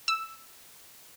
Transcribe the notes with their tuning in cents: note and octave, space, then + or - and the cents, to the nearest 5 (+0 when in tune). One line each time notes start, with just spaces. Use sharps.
E6 +0